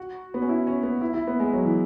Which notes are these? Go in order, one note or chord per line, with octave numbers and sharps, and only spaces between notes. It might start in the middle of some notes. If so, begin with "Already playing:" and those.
Already playing: F#4
B3
C#4
E4
C#4
B3
E4
E4
B3
G#3
F#3
E3